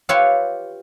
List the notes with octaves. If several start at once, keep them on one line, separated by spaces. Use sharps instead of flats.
F4 G4 B4 C#5 E5 F5